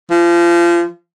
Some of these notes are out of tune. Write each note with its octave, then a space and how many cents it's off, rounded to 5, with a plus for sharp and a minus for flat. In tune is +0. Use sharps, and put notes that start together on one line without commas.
F3 -30